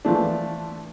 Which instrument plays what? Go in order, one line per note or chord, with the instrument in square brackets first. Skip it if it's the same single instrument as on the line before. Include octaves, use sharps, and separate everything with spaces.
[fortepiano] E3 F3 A3 D4